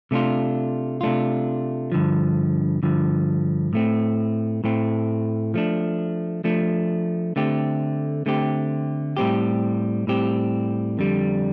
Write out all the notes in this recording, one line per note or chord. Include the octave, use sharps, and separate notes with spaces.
C3 A3 D4 F4
C3 A3 D4 F4
G2 D3 F3
G2 D3 F3
A2 A3 C4
A2 A3 C4
F3 A3 D4
F3 A3 D4
D3 A3 C4 G4
D3 A3 C4 G4
A2 G3 C4 G4
A2 G3 C4 G4
F2 D3 G3